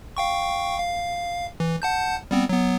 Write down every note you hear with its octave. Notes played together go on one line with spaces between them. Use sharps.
F5 G5 C#6
F5
E3
F#5 A5 G6
G3 B3 C4
F#3 B3